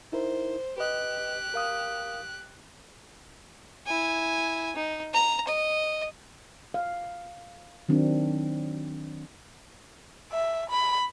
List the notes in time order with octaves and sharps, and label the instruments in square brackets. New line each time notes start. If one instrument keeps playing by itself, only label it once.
[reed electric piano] D#4 E4 A#4 [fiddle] C5
[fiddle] G4 F#6 [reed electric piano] B4 D#5
[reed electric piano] A#4 F5 D#6
[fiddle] E4 G#5
D#4
A#5
D#5
[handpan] F5
D#3 F#3 C4 D4
[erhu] E5
B5